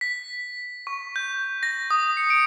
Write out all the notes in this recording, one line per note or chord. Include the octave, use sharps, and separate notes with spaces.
B6
C#6
G6
A#6
D#6
C#7
D7